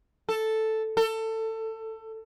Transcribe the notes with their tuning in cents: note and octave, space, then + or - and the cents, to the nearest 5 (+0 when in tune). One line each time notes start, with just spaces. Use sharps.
A4 +0
A4 +20